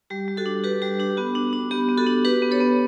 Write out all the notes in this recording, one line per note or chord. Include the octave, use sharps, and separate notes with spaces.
G3 G4
G3
F#4 A4
D4
F#4 G4 B4
G3 G4
D4 G4
B3 F#4
D4
D4
B3 G4
B3
F#4 A4
D4
D4 G4 B4
B3
A4 C#5
B3